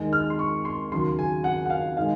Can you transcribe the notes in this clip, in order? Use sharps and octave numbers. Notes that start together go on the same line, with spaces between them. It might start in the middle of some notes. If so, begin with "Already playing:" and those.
Already playing: D#2 D#3 G#3
F6
C6
C#6
C6
D#2 C#3 F#3 C6
G#5
F#5
F#5
F5
D#3 G#3 F5